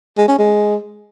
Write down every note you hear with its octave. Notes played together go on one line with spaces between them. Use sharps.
G#3
C#4
G#3